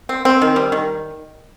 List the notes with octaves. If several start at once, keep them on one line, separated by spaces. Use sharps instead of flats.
C4
C4
D#3
G3
D#3